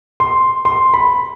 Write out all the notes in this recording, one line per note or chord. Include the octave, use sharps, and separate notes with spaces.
C6
C6
B5